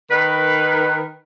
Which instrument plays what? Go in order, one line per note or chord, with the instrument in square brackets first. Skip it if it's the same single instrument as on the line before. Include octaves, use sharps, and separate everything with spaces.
[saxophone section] D#3 B4